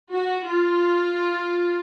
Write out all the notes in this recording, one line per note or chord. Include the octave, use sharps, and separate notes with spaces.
F#4
F4